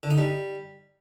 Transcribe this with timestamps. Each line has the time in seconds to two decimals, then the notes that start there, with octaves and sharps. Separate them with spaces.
0.03 D3
0.10 D#4
0.18 G3